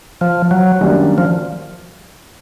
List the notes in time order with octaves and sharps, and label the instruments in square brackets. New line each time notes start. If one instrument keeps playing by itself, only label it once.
[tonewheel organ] F3
F#3
[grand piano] F#2 D#3 G3 A#3 D4
[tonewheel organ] F3